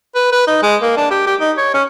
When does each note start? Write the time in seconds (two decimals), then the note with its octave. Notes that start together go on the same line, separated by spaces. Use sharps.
0.15 B4
0.32 B4
0.47 D#4
0.63 G#3
0.82 A#3
0.97 D4
1.11 G4
1.27 G4
1.40 D#4
1.57 C#5
1.74 C#4